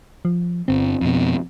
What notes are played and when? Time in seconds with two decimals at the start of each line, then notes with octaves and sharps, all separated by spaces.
0.25 F3
0.68 G1 C4
1.01 F2 B2